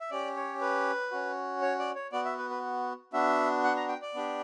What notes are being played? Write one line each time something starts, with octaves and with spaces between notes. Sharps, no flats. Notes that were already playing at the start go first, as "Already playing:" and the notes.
E5
C#4 G4 D5
C#5
B4
C#4 F#4
C#5
D5
C#5
B3 F#4 D5
E5
B4
B4
B3 D4 F#4 E5
F#5
A#5
G5
D5
B3 D4 G4